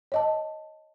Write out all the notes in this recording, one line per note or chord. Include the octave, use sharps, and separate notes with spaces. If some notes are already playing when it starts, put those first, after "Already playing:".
C#5 D#5 A5